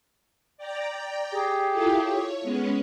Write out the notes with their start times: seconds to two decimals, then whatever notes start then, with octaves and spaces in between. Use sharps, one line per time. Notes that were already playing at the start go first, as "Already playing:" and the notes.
0.57 D5 G5 A#5
1.33 G4 G#4
1.69 E4 F4 A4
2.01 C#5
2.41 G#3 B3 C#4